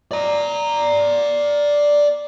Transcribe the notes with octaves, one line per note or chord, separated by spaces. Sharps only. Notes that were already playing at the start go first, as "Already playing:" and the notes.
D5 A#5